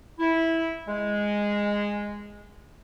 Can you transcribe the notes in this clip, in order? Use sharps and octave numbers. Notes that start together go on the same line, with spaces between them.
E4
G#3